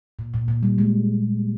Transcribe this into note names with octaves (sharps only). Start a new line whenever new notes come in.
A#2
A#2
A#2
G3
G#3